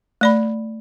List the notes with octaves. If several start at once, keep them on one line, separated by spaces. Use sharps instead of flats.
A3 D5 B5